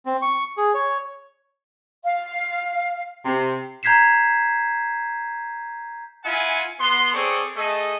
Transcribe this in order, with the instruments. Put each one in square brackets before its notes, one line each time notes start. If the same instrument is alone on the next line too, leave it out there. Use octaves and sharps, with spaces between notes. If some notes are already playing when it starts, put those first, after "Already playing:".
[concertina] C4
C#6
G#4
C#5
[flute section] F5
[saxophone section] C3
[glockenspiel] A#5 G6 G#6 B6 C7 E7
[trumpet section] E4 F4 F#5 G#5
B3 C6
C4 G#4 A4 C#5 D5
A3 G#4 A4 D#5